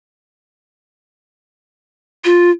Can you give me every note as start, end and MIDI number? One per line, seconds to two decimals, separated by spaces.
2.25 2.50 65